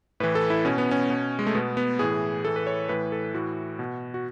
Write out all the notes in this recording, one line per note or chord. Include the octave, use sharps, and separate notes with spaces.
A2 E3 B4
A4
E4
B2 C#4
B3
C#4
B2
G#3
A3
B2 B3
B3
A2 E3 G#4
A2 E3 A4
B4
C#5
A2 E3 B4
A4
A2 E3 F#4
B2
F#4